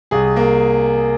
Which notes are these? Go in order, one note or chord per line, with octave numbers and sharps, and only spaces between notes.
C2 G#4
A#3